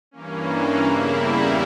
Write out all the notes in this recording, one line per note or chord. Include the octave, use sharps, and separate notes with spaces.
G2 E3 A#3 C#4
E2 C#3 G3 A#3 E4